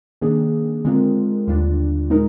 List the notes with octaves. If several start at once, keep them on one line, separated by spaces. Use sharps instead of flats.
C3 D#3 A#3 D4 G#4
D3 G#3 C4 F4 A#4
D#2 D3 G3 D4 F4
A#2 G#3 D#4 A#4